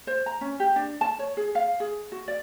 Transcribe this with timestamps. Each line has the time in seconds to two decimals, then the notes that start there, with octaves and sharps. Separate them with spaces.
0.07 C5
0.26 A#5
0.41 C#4
0.60 G4
0.76 D4
1.01 A5
1.19 C#5
1.37 G#4
1.55 F5
1.80 G#4
2.12 F#4
2.28 D5